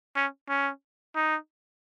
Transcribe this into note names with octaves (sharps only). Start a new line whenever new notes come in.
C#4
C#4
D#4